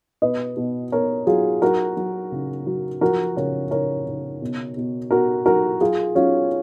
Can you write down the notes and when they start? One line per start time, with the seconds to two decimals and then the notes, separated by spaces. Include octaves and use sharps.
0.22 B2 B4 D#5
0.57 B2
0.92 B2 A#4 C#5
1.27 F#3 F4 G#4
1.62 F#3 F#4 A#4
1.97 F#3
2.32 C#3
2.67 F#3
3.01 F3 F#4 A#4
3.36 C#3 A#4 C#5
3.71 C#3 A#4 C#5
4.07 C#3
4.42 B2
4.77 B2
5.11 B2 F#4 A#4
5.46 F#3 F#4 A#4
5.81 F#3 F4 G#4
6.15 F#3 C#4 F4